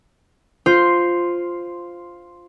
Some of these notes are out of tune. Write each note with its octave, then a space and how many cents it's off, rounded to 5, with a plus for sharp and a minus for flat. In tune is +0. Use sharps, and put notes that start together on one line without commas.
F4 +0 C5 +0